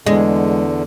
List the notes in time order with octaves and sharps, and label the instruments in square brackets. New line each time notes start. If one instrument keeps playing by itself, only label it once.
[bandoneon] E2 D3 [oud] G#3